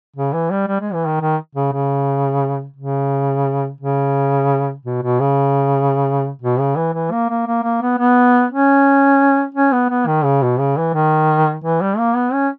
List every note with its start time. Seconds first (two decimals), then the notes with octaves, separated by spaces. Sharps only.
0.16 C#3
0.33 E3
0.51 G3
0.67 G3
0.81 G#3
0.93 E3
1.06 D#3
1.21 D#3
1.55 C#3
1.72 C#3
2.76 C#3
3.81 C#3
4.85 B2
5.02 B2
5.20 C#3
6.42 B2
6.59 C#3
6.76 E3
6.93 E3
7.12 A#3
7.29 A#3
7.47 A#3
7.63 A#3
7.81 B3
7.99 B3
8.51 C#4
9.54 C#4
9.72 B3
9.90 B3
10.07 D#3
10.24 C#3
10.42 B2
10.59 C#3
10.77 E3
10.94 D#3
11.64 E3
11.81 G3
11.98 A#3
12.15 B3
12.33 C#4